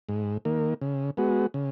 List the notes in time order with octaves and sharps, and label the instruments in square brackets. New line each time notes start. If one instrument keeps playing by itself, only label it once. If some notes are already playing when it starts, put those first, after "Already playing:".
[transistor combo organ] G#2
D#3 A#3
C#3
G#3 B3 F#4
C#3